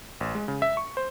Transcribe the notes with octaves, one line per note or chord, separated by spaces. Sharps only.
A1
G#3
C#3
E5
C#6
C5